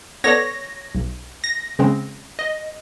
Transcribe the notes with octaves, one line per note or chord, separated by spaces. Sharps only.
B3 A4 C#5 D5 A#6
B1
A#6
C#3 G#3 C4
D#5